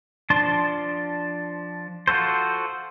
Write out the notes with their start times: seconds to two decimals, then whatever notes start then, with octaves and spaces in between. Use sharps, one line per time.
0.30 F3 D4 D5 A5 C6
2.07 F4 F#4 A4 C5